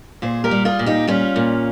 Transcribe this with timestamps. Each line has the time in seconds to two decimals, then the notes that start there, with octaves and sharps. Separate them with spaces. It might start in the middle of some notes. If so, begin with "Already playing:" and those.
0.22 A#2 G#4 C5
0.44 G4 A#4
0.51 G3
0.65 F4 G#4
0.79 A#2
0.86 D#4 G4
1.07 G3 C#4 F4
1.36 A#2